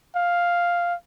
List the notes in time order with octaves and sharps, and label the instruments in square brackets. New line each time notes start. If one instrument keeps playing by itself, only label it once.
[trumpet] F5